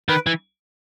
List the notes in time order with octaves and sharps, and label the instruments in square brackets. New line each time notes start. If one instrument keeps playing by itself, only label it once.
[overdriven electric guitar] D#3 [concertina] B4
[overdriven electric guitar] E3